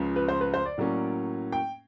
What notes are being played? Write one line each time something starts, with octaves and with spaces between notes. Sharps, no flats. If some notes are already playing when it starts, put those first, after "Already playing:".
Already playing: C#2 C#3 F3
B4
C5
B4
C5
D5
A2 F#3 A#3 C#4
G5